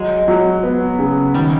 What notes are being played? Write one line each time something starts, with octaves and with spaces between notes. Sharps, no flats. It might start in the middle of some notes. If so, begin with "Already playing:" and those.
Already playing: F#3 G#3
F#3
B3
C#3
D#3 G3